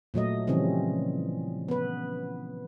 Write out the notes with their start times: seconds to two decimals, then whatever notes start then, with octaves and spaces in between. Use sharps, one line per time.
0.14 A#2 F#3 A3 D#5
0.47 C#3 E3 F3 G3 C4 C#4
1.68 B3 B4